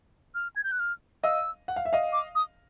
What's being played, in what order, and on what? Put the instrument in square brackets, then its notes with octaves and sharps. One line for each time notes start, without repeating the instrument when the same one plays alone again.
[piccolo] F6
G#6
G6
F#6
F6
[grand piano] D#5 F5 [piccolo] E6
[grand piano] F#5
F5
E5
D#5 F5
[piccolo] D6
D#6